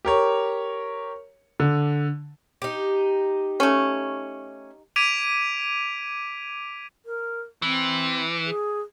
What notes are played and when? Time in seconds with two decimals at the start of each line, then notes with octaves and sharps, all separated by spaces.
0.05 G4 A#4 C#5
1.60 D3
2.62 D#4 G4
3.60 A3 C#4
4.96 D6 G#6 B6 D7 D#7 F7
7.06 A#4
7.62 E3 C4
8.46 G#4